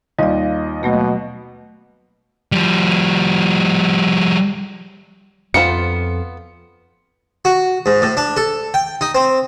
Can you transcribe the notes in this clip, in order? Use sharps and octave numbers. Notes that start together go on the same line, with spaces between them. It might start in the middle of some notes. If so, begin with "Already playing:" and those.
D#2 G3 F4 D5 D#5
B2 F#3 A3 A#3
F3 G3
F2 B3 F4 C5 C#7
F#4
G#2
A2
D4
A4
G5
D#4
C4